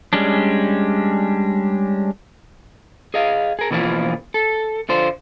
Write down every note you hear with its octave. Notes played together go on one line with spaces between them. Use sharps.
G3 G#3 C#4 D4
G#4 D#5 F5
G#4 A#4
B2 E3 F3 A#3 F4
A4
D3 F4 C5